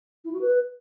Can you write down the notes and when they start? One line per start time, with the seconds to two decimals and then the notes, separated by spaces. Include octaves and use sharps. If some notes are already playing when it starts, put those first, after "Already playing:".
0.24 E4
0.32 F#4
0.41 B4